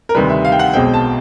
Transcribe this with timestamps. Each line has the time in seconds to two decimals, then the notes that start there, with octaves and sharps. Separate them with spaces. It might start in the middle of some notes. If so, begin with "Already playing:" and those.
0.09 A#4
0.15 D2 C3 D#3 G3 B4
0.29 E5
0.45 F5
0.52 G5
0.59 F#5
0.73 B1 B2 G#3 C4 G5
0.94 A5